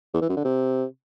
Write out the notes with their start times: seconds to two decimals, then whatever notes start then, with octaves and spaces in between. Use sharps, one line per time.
0.14 E2
0.21 E3
0.29 F#2
0.36 D3
0.44 C3